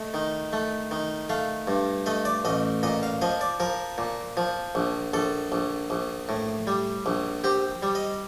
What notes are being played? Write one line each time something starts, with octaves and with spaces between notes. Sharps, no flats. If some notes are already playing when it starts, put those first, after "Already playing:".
Already playing: A3 D#5
D#3
A3
D#3
A3 F5
G2
A3 D#5
D5
A1 D#5
A#2 D#5
F5
F3 D#5
D5
F3 A#4
A#2
F3
A#1
A#1 A4
A#1
A#1
A2
G3
A#1
C4 G4
G3
D#5